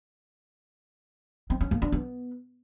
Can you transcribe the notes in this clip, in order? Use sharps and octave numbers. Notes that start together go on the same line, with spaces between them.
C4
C#4
A#3
D4
B3